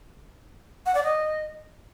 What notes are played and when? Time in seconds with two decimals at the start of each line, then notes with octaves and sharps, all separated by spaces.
0.86 F#5
0.95 D5
1.04 D#5